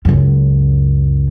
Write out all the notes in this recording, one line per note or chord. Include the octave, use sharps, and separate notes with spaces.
C#2 F#2